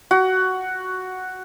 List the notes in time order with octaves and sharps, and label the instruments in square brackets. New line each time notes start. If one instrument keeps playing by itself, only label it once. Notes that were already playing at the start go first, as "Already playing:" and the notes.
[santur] F#4